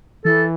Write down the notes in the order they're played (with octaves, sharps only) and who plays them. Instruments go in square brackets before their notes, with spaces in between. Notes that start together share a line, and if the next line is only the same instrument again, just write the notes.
[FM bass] E3 [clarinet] A4